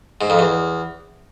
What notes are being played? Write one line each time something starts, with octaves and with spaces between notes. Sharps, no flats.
G#2
F2
E2